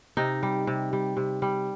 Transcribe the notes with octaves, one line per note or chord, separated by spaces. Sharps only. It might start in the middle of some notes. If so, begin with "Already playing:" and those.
C3 D#4
G3
C3
G3
C3
G3